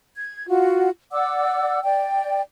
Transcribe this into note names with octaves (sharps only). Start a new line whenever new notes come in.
G#6
F4 F#4
D5 F#5 D6 E6
D5 G5